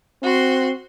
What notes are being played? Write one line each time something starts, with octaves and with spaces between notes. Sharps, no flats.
C4 F#4 C6